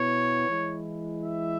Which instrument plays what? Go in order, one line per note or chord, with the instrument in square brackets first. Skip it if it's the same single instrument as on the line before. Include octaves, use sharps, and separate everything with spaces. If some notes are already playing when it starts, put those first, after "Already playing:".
Already playing: [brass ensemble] B2 B3 E4 C#5
E3 G#3 E4
E5